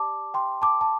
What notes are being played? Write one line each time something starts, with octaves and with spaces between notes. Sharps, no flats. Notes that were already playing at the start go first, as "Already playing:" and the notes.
Already playing: G4 D5 A5 D6
G5 C6
A5 D6
A5